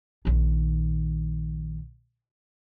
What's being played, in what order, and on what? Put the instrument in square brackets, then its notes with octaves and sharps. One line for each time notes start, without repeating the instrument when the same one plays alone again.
[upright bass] A#1 D#3